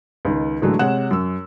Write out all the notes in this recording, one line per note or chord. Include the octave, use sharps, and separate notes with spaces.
C#2 D#3
A2 D3 E3 F#3 G#3 A3
C3 G#3 C#5 F#5 F#6 E7
F#2 E6